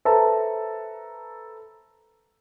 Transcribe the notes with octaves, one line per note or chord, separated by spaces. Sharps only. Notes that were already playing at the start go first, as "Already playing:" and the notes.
A4 B4 C5 E5 A5 A#5